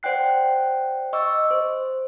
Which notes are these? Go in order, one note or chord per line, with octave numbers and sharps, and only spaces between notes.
C5 D5 F#5 G5 F#6 C7
D#5 C#6 D6 E6
C5